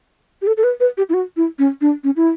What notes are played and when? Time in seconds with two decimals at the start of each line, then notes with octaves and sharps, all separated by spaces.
0.42 G4
0.47 A4
0.57 A4
0.64 B4
0.80 B4
0.97 G4
1.09 E4
1.14 F#4
1.36 E4
1.59 C#4
1.81 D4
2.04 C#4
2.16 E4